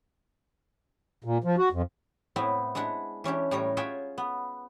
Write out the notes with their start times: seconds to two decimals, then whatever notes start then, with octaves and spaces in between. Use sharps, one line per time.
1.24 A#2
1.44 F3
1.58 F#4
1.72 F2
2.36 A2 B3 C4 E4
2.75 G#3 D4 E4 F#5
3.24 E3 C#4 D4 G4
3.51 A2 G3 C#5 A#5
3.77 F4 G#4 C#5 E5 F#5 G5
4.18 B3